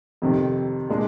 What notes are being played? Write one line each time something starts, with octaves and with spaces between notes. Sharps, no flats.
F2 C3 D#3
A#2 G#3 D4